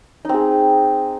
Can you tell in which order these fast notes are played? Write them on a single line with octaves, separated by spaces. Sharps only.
D#4 C4 G#4